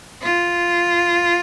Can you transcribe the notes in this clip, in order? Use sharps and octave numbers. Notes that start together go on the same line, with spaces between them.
F4